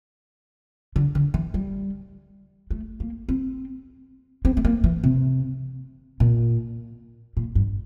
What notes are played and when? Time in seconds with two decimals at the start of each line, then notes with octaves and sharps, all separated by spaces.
0.96 D3
1.15 D3
1.34 E3
1.54 G3
2.71 A3
3.00 A#3
3.29 C4
4.45 C4
4.57 A3
4.65 A#3
4.84 E3
5.04 C3
6.20 A#2
7.37 A#2
7.55 G2